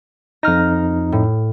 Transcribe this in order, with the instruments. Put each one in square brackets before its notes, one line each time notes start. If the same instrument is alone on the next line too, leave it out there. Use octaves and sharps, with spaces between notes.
[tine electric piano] F2 D#4 [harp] F6 A#6
[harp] A2